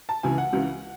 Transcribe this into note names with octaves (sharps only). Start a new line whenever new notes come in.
A5
C#2 C#3 E3 G#5
F#5
C#2 C#3 E3